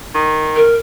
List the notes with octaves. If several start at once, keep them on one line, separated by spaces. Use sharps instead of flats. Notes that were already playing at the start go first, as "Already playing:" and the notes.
D#3
A#4